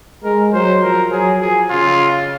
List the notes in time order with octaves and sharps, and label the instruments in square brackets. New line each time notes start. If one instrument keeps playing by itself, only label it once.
[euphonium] G#3 [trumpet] A#4
[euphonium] F#3 [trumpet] C5
[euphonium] F3 [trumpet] A#4
[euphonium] F#3 [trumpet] G#4
[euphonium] F3 [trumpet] G#4
[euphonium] C#3 [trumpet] F4